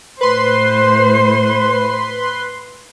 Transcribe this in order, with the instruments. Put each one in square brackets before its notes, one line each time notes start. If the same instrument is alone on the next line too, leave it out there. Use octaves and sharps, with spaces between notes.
[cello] A2 C5 [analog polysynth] B4 C6